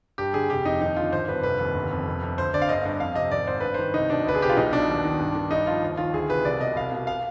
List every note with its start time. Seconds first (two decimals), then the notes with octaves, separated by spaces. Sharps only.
0.18 G2 G4
0.34 D3 G#4
0.50 F1 G4
0.65 F2 D#4
0.81 D#2 D#4
0.96 D3 F4
1.12 G#1 C5
1.28 G2 B4
1.43 F1 B4
1.59 D#2
1.74 G1
1.91 F2
2.06 F1
2.22 F2
2.38 D2 C5
2.53 D3 D5
2.62 F5
2.69 G1 D#5
2.85 G2
3.00 F2 F5
3.15 C3 D#5
3.31 G#1 D5
3.47 G#2 C5
3.60 G2 B4
3.74 D#3 C5
3.94 C2 D#4
4.10 B2 D4
4.25 D2 B4
4.35 G#4
4.41 C3 G4
4.49 F4
4.57 B1 D#4
4.73 B2 D4
4.88 D#2
5.05 D#3
5.19 G2
5.35 D#3
5.51 G2 D#4
5.66 F3 F4
5.83 D#2
5.97 D#3 F4
6.14 D2 G#4
6.30 C3 B4
6.45 C2 D5
6.60 B2 D#5
6.76 C2 F5
6.92 B2
7.07 F5